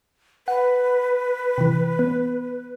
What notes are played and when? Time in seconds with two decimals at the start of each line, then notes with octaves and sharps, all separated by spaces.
0.48 B4 F#5
1.58 C3 E3
1.99 B3